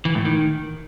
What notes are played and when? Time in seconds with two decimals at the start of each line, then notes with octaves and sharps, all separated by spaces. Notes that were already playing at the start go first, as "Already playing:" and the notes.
0.05 E3
0.15 A2
0.25 D#3